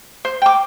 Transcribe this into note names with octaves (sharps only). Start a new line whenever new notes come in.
C5
G5 D6